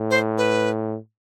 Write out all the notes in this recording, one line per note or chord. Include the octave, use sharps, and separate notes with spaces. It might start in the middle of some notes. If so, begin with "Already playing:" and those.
Already playing: A2
C5
B4